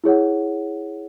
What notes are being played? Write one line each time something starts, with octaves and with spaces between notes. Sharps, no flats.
E4 G#4 C#5 F#5